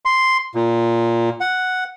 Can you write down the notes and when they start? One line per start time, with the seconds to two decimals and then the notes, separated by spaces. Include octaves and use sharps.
0.05 C6
0.55 A#2
1.40 F#5